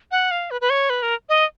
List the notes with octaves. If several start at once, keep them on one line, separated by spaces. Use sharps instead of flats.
F#5
F5
B4
B4
C#5
B4
A#4
D#5